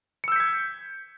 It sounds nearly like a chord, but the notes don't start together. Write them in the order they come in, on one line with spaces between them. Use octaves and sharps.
C#7 E6 G6 B6 G#6